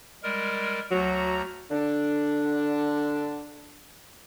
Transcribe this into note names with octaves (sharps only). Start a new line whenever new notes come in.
G3 G#3 A#4
D2 F#3 F#4 A#5
D3 D4